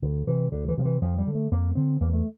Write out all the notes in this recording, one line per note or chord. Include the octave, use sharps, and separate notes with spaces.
D2 D3
C3 E3
D2 D3
E3
C3 F3
E3
F2 F3
G3
D3
A3
F2 A#3
D3 C4
E2 A#3
A3